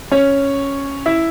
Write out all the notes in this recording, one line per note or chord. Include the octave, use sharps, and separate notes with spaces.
C#4 C#5
E4 E5